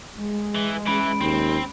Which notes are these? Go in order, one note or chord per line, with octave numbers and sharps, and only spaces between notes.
G#3
E3
E3 C#4 B5 D7
D#2 C4